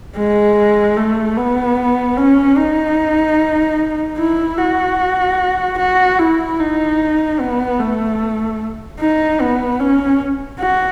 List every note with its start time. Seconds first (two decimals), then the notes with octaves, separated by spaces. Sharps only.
0.17 G#3
0.96 A3
1.37 B3
2.17 C#4
2.57 D#4
4.18 E4
4.58 F#4
5.78 F#4
6.19 E4
6.59 D#4
7.39 B3
7.79 A3
9.00 D#4
9.40 B3
9.80 C#4
10.60 F#4